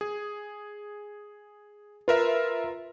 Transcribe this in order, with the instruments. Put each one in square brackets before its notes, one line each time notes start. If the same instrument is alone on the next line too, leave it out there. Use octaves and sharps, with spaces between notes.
[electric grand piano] G#4
[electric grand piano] F4 A#4 E5 [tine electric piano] B4